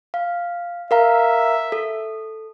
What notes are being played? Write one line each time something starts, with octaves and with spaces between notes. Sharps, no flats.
F5
A#4 E5 F5 A#5
A4